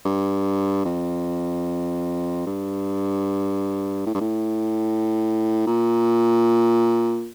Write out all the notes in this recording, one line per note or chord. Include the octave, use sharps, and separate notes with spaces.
G2
F2
G2
A2
G2
A2
A#2